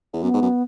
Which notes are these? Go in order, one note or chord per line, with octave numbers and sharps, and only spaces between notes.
E2
F#2 B3
G#2
F#2